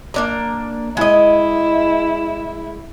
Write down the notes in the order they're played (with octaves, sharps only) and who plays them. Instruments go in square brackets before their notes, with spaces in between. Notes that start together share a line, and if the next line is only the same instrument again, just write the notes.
[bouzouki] A#3 D4 A#5
[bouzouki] G#3 D#5 [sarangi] E4